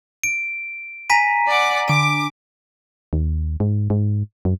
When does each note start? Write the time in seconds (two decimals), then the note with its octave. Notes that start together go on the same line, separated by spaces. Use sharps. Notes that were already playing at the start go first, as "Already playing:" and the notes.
0.23 D7
1.10 G#5 A#5 B6 D#7
1.48 D5 F#5 D6
1.88 D3 D6 D7
3.13 D#2
3.60 G#2
3.90 G#2
4.45 F#2